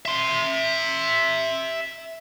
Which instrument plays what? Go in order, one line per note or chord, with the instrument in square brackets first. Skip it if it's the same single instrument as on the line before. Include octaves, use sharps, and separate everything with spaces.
[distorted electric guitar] E5 C6